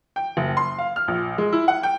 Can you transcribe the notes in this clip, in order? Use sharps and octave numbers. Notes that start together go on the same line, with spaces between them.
G5
F#1
C6
F5
F6
A#1
G#3
E4
F#5
G5